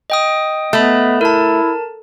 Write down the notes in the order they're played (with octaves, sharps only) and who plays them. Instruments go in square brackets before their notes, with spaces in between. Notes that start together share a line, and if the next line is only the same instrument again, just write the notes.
[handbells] D#5 G5 D#6
[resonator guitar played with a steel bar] A3 [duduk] B3 [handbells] D#5 B5
[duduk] E4 [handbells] A#4 A5